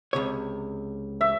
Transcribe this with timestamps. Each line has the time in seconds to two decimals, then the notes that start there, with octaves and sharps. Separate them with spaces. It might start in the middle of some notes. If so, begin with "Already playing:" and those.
0.13 C#2 C3 C#5
1.21 E5